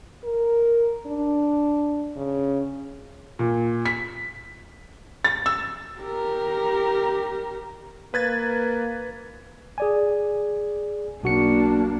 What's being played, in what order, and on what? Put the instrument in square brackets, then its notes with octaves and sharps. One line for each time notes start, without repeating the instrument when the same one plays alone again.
[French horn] A#4
D4
C#3
[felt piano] A#2
B6
A6
E6
[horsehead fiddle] G4 A#4
[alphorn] A#3 [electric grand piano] B4 G#6 A6
[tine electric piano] G#4 D5 G#5
[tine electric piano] B1 F#4 C#7 [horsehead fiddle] A#3 D4